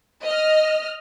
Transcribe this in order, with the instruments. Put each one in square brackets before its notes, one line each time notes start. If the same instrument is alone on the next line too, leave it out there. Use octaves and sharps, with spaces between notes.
[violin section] D#5 F6